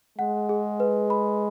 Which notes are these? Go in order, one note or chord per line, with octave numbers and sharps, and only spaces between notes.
G#3 F#5
G#4
B4
B5